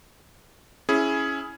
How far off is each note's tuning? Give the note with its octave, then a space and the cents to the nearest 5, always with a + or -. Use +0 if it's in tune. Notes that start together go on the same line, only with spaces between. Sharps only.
C#4 +0 E4 +0 G#4 +10